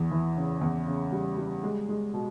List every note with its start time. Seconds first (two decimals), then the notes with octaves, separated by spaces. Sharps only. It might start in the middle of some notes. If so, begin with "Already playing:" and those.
Already playing: E2 E3
0.11 E3
0.36 C#3
0.61 E2
0.87 C#3
1.12 G3
1.38 G3
1.64 G#3
1.89 G#3
2.14 B2